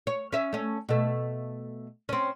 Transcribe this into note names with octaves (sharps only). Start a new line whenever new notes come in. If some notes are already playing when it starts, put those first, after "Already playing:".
C#5
C#4 E5
A3 C#4
B2 A3
C4 C#4